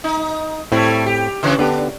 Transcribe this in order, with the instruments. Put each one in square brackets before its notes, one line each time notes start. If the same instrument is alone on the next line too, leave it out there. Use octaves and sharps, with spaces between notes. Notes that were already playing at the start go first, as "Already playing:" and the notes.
[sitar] D#4
[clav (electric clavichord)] A2 C4 [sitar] G3 A3 E4
[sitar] G4
C#3 E3 C#4
[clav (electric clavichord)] D3 B3 G4 [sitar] D4